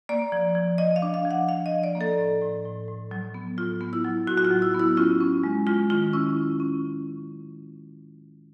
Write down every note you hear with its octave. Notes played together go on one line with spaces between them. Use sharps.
A#3 D5
F3
F3
F3 D#5
F5
D4
F5
F3
F#5
F3 F5
D#5
F3
D5
A#3
A4
A2
A2
A2
A2
F#3
B3
A2 F4
B3
E4
F#3
A2 F#4
F#4
F4
F#3
E4
B3
E4
C#4 F4
C#4
G#3
G#3 F4
D#3 F4
C#4 E4
C#4
C#4